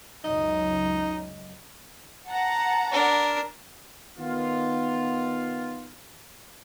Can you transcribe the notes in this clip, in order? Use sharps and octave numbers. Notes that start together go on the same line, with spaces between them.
C#2 F#2 D#4 D#5
F#5 A5 A#5
D4 A#4
D#3 B3 F4